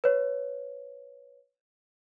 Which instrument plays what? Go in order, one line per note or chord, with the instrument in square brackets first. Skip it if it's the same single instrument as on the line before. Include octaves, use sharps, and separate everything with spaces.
[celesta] B4 C#5